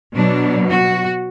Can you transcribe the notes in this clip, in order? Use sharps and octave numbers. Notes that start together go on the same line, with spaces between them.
B2 F#3 D4
F#4